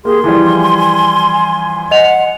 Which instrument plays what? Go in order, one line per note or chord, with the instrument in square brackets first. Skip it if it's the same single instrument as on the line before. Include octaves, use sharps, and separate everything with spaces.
[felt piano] A#3 G4 [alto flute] G#4 [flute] C6
[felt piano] E3 F3 G3 [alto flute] G#5
[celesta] D#5 F7 [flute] F#5